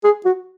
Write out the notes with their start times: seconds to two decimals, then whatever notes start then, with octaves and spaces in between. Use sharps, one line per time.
0.04 G#4
0.25 F#4